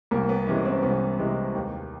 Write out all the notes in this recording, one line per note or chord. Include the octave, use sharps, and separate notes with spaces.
C2 A#3
B3
C3 E3 G#3 C#4
C4
C2 B3
C3 E3 G#3
D#2